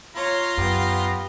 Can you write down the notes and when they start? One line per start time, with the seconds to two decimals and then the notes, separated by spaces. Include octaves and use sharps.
0.16 F4 C#5 A#5 C6
0.58 F#2 B3 G4